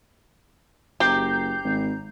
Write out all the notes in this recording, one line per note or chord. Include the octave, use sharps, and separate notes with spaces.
F#1 G4 A#5 G6 C7
G#1